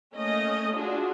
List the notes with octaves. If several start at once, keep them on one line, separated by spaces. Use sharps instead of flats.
A3 A#3 C#4 D#5
D4 F4 F#4 G#4